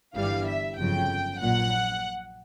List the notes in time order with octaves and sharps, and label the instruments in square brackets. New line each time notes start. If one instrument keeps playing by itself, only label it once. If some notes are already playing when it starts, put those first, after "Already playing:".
[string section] G1 G2 E3 G3 F5
E5
G1 F2 C#3 F#3 G5
A#1 A#2 F#3 F#5